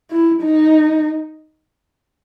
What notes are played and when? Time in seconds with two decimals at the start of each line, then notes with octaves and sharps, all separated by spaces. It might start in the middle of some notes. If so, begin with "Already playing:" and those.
0.10 E4
0.41 D#4